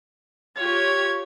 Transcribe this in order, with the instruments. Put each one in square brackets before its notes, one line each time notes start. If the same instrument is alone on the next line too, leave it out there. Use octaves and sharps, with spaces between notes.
[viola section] F4 G4 C#5 [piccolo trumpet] G#6